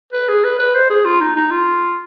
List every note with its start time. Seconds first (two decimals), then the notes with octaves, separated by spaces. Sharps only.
0.13 B4
0.29 G#4
0.44 B4
0.59 B4
0.75 C5
0.90 G#4
1.05 F4
1.21 D#4
1.36 D#4
1.51 F4